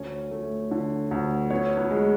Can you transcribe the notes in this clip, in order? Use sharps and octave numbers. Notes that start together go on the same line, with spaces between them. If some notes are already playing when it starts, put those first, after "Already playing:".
Already playing: D2 C#4 C#5
A3
D3
D2
B3 C#4 C#5
B3 B4
G#3